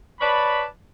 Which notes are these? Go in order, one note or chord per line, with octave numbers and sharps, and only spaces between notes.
B4 C#5 D5 A5 B5